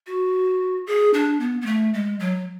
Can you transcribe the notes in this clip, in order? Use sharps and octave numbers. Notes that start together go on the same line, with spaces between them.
F#4
G#4
D4
B3
B3
A3
G#3
F#3